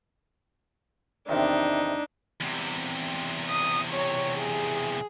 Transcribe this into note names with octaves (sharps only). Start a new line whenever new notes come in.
E2 C3 D#3 D4 D#4
E2 C3
D#6
C#5
G#4